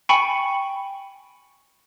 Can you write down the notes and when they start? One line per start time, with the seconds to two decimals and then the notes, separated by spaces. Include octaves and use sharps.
0.09 G5 G#5 B5 C#6 C#7